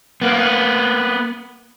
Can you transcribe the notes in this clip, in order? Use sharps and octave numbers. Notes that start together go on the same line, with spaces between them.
A#3 B3